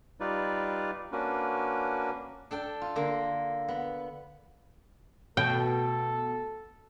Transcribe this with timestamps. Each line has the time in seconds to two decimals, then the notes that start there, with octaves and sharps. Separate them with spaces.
0.20 G3 D#4 F4 B4 D5
1.12 A#3 C#4 D4 F#4 A#4 B4
2.51 D4 A4 G5
2.81 F4
2.96 D3 A#3
3.68 B3
5.37 B2 A3 A4 G5